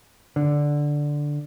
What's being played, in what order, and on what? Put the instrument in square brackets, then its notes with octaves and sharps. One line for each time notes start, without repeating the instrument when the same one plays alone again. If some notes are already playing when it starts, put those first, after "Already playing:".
[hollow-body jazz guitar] D3